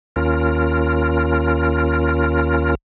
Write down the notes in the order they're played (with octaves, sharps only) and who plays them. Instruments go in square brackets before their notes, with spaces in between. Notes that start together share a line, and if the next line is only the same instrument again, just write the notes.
[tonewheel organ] D#2 C#4 F4 A#4